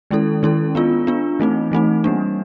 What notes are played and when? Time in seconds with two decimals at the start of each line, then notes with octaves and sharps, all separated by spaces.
0.11 D#3 G#3 C#4 E4 A4
0.43 D#3 G#3 C#4 E4 A4
0.75 B3 D4 F4
1.07 B3 D4 F4
1.40 E3 A3 C4 D#4
1.72 E3 A3 C4 D#4
2.04 G3 A#3 D4